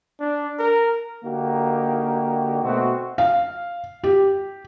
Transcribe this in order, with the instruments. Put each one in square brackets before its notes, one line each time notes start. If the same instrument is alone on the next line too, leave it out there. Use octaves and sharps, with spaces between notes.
[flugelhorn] D4
A#4
[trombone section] D3 A#3 D#4 F#4 G4
B2 A3 C4 F#4
[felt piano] F5
G4